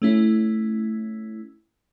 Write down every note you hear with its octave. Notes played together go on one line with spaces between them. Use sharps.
A3 C#4 E4